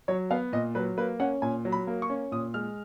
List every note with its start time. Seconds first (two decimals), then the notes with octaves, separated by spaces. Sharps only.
0.08 F#3 C#5
0.30 B3 F5
0.53 A#2 D#5
0.75 F#3 B4
0.98 A#3 B4
1.20 C#4 F#5
1.42 A#2 G#5
1.65 F#3
1.72 B5
1.87 A#3
2.02 C#6
2.10 C#4
2.32 A#2 D#6
2.54 G#3 F6